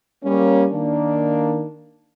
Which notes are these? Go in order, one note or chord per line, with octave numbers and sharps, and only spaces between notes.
G3 A#3 C#4
D#3 A#3 D4